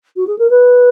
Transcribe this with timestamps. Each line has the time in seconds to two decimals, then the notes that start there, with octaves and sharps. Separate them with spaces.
0.16 F#4
0.27 G#4
0.38 A#4
0.50 B4